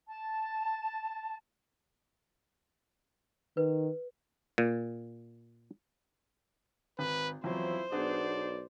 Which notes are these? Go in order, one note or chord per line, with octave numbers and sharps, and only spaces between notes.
A5
D#3 B4
A#2
G#1 B4
E2 F3 F#3 C4 E4 C5
B1 B3 D4 G#4 D5